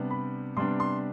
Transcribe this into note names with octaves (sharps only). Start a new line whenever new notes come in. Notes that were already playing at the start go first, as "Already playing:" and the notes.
Already playing: C3 G3 B3 D4
B5
C3 G3 B3 D4 C6
C6